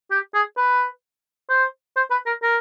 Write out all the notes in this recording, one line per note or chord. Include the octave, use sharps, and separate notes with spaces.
G4
G#4
B4
C5
C5
B4
A#4
A#4